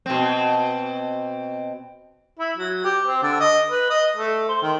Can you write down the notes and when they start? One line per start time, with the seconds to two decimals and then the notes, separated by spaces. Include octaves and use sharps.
0.06 B2 C4
2.39 E4
2.57 F#3
2.84 G4
3.06 C4
3.23 D3
3.40 D#5
3.70 B4
3.90 D#5
4.17 A3
4.48 C5
4.62 D#3